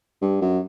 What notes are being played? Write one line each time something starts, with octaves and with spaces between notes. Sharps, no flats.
G2
F#2